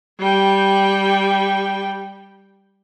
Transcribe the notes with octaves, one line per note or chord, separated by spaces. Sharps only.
G3 G5